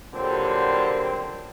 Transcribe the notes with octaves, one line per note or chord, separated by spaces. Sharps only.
A#2 D3 F#3 G3 C4